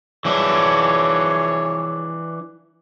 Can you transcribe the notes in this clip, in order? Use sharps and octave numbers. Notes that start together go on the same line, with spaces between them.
F2 E3 D4 G#4 C#5